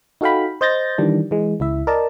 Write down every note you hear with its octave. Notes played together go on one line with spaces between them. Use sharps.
D#4 F#4 A4 F5 G5 B5
C5 D#5 G6 A6 A#6
D#3 E3 G3 D4
E3 G#3
C#2 E4 E5
A#4 D5 D#5 A5